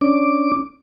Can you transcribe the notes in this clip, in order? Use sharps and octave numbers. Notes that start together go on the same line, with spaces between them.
C#4 D4 D6